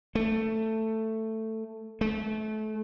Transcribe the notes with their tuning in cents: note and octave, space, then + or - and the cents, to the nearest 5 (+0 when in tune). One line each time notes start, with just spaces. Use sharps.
A3 +10
A3 -30